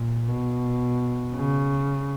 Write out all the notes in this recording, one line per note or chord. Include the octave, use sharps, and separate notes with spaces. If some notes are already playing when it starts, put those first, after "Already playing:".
Already playing: A#2
B2
C#3